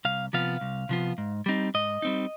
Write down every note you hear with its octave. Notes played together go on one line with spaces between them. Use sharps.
C2 F5
C3 F3 B3 F4 F5
C2
C3 F3 B3 F4
G#2
G3 C4 D#4
G#2 D#5
G3 C4 D#4